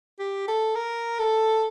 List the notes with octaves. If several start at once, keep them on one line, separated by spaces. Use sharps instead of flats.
G4
A4
A#4
A4